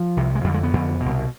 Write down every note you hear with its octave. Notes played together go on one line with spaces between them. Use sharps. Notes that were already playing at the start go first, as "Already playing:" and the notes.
Already playing: F3
C2 C3
G#3
F2 D3 G3
G#3
B3
F2 D3
B2
C2